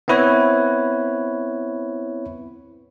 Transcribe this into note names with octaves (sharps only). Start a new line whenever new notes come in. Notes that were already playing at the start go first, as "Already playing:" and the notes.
B3 C4 E4 B4 C#5